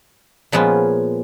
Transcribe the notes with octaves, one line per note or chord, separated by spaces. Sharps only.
A#2 F3 G#3 B3 C#4